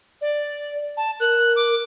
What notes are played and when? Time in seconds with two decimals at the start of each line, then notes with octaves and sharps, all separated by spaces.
0.21 D5
0.97 A5
1.20 A#4 F#6
1.56 D6